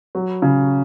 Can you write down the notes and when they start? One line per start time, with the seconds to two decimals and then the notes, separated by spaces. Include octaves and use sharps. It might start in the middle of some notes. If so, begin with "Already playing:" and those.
0.15 F#3
0.42 C#3